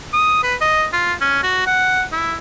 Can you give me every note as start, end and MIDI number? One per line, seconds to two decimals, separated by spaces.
0.13 0.38 87
0.43 0.55 71
0.61 0.86 75
0.93 1.13 65
1.21 1.43 61
1.43 1.62 66
1.66 2.04 78
2.12 2.36 64